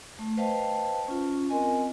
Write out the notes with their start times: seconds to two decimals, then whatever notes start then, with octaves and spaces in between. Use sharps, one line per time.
0.19 A3
0.37 B4 C5 D#5 F5 G5 A5
1.08 C#4 F4
1.49 C4 A#4 D#5 G#5